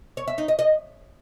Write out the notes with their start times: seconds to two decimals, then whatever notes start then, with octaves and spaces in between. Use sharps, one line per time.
0.17 C#5
0.28 E5
0.38 D#4
0.48 D#5
0.59 D#5